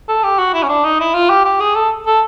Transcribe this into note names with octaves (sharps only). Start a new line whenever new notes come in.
A4
G4
F#4
E4
C#4
D4
D#4
E4
F4
G4
G4
G#4
A4
A4